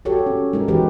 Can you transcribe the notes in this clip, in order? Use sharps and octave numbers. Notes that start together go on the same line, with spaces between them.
F#4 G4 A4 C#5
C#4
G#3 D#4 A#4
E3 F#4 G4 B4